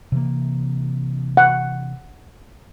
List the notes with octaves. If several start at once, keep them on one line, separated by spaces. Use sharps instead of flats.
C3 E3 A#3
F#5